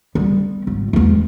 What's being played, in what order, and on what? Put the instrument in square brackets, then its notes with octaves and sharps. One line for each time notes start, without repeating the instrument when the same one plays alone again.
[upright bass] G3 B3
G#1
E2 G#3